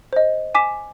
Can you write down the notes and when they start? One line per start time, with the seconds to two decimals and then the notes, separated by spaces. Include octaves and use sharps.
0.13 C5 D#5
0.55 G#5 D6 B6 E7